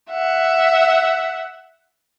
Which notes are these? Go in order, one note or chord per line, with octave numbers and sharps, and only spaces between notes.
E5 F#5